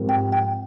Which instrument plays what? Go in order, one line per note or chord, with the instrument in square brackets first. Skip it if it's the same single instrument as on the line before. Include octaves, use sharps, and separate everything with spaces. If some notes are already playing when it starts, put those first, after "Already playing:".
Already playing: [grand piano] G#2 F3 C4 G4 A#4
[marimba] G5
G5